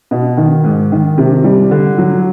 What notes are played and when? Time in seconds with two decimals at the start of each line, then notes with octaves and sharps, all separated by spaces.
0.11 B2
0.37 D#3
0.64 G#2
0.92 D#3
1.18 C3
1.44 G3
1.71 D3
1.98 F#3